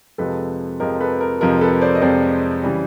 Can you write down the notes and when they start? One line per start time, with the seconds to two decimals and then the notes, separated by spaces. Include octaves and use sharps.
0.18 F2 C3 F3 G#3 A4 B4
0.80 F2 C3 F3 G#3 A#4
1.01 A4 B4
1.21 A#4
1.41 F2 C3 F3 G#3 A#4
1.61 A4 B4
1.81 C5 D5
1.95 D#5
2.02 F2 C3 F3 G#3 C5 D5
2.63 C#3 E3 G3